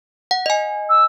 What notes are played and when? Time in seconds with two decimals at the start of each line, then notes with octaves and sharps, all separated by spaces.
0.31 F#5
0.46 D#5 G#5
0.89 E6